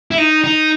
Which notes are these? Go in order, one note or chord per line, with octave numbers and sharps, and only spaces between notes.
E4
D#4
D#4